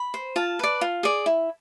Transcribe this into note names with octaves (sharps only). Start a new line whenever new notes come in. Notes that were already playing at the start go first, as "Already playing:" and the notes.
Already playing: B5
C5
F4 A5
B4 D5
F4
G#4 D5
E4